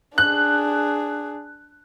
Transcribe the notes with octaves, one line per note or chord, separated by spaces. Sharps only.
D4 G#4 F#6